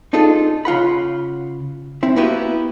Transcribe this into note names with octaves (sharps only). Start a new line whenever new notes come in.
D4 D#4 F4 G#4 A4
C#3 F4 F#5 B5
C4 E4
A#3 B3 E4 F#4 G4 B4